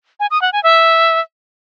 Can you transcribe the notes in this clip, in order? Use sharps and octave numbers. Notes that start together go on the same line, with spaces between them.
G#5
D#6
F#5
G#5
E5